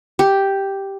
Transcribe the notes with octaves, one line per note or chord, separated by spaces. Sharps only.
G4